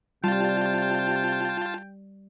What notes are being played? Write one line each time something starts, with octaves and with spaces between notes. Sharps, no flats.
C3 G3 F4 G5 A5